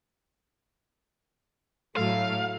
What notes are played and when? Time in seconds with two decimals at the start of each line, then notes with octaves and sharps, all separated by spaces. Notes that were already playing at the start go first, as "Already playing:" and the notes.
1.97 A2 F#3 A4 F5